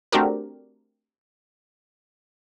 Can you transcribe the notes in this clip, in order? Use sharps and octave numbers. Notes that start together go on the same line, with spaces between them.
A3 C4 D4 F#4 G4 A#4